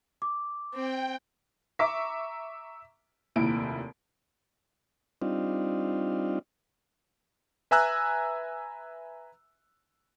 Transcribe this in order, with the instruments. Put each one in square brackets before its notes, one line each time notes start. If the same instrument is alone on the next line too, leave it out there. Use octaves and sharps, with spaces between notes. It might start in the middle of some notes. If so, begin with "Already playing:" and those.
[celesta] D6
[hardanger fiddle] C4 [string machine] G5
[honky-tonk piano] E5 A#5 C#6 D6
F1 D#2 A#2 E4 D7
[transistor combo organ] G3 C4 D4 D#4 F4
[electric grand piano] B4 E5 G#5 A#5 E6 F#6